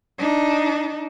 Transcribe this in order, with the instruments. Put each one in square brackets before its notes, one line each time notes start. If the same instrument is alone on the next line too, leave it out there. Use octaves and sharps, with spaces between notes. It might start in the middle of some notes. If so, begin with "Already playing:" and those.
[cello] D4 D#4